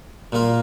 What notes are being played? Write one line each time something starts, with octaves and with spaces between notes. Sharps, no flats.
A#2 A#3 F4